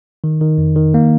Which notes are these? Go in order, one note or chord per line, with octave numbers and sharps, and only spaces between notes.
D#3
D#3
F2
D#3
A#3